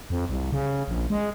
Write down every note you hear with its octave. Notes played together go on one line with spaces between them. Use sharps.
F2
C2
C#3
A#1
G#3